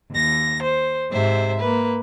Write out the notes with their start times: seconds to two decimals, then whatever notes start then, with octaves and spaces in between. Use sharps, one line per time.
0.11 D#2 A#6
0.61 C5
1.11 G#2 C3 C5 E5
1.58 A#3 B4